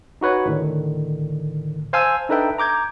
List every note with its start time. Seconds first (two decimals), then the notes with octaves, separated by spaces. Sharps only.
0.21 D#4 F#4 B4 C#5
0.46 A2 D3 D#3
1.93 C5 F5 G#5 A5 E6
2.29 D4 D#4 A4 B4 E5 G5
2.58 A#5 D6 G6 G#6